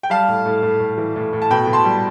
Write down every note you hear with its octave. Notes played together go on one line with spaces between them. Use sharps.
G5
G3 F5 A5
A2
A2
A2
A2
E3
A2
A2
A5
B2 G5 B5
B2
A5 C6
G3